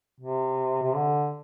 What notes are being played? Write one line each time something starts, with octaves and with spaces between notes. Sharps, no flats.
C3
C3
D3